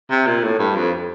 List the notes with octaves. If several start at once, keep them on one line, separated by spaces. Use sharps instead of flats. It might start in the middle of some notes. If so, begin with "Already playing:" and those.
C3
A#2
A2
G2
F2